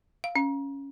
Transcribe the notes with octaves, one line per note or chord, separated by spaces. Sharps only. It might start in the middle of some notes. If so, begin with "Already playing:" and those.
F5
C#4